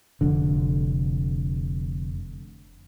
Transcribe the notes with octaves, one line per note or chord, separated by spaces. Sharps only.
F1 D3